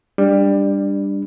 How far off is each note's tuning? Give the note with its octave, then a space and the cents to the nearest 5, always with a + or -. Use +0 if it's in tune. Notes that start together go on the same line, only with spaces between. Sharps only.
G3 +15 D4 +0